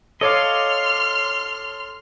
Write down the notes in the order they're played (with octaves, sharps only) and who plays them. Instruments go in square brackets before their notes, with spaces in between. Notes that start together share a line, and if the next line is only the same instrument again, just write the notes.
[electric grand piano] A4 C#5 D6 [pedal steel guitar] D#5 F5 [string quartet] C6 F6